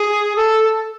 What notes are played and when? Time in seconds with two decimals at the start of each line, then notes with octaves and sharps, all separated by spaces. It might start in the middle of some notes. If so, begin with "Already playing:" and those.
Already playing: G#4
0.36 A4